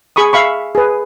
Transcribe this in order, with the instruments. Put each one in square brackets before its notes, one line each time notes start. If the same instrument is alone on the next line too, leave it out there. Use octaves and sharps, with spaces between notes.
[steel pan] G#4 B5 C#6 D#6
E5 F5 B5 C#6
G#4 B4